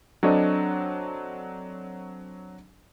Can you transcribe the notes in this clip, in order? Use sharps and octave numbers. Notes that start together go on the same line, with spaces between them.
F#3 C4 D4 A4 C#5 D#5